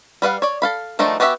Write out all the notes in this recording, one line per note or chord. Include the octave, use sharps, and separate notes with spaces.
G3 B4 F5 F#5
C#5 D5
A4 F5 B5
D#3 F3 A3 D4 D#4
B3 F#4 G4 D#5 E5